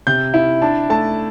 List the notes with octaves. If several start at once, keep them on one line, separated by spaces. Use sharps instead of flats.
C3 G6
E4
D4 A5
A3 A5